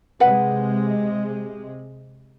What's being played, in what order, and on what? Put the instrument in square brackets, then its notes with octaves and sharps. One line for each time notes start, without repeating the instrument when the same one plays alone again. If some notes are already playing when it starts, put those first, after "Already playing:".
[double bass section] C3 G#3 [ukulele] B4 F#5